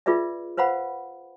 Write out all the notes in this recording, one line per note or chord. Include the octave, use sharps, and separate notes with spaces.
F4 G#4 B4 D5 E5
B4 C5 F5 F#5 B5